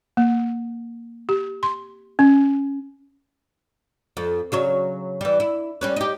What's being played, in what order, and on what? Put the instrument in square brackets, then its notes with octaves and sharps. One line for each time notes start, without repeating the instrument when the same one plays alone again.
[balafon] A#3
G4
C6
C#4
[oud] F2
C#3 F#3 C#5
E3 G3
E4
G3 C#4 B4
D#4 G4